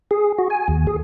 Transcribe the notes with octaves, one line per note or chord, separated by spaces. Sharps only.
G#4
F#4
G#5
D#2
G#4